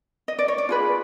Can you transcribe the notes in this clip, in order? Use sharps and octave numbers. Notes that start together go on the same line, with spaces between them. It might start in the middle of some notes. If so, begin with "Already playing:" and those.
D#5
D5
C#5
D5
F4 G#4 B4